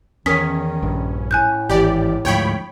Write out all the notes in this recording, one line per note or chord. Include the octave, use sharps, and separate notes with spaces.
E2 D#3 C#4 A#4 D#6 B6
A#1 G2
A2 G#5 F#6 G6
G#1 E3 G4 D5
D2 G#2 F3 C#5 G5 B5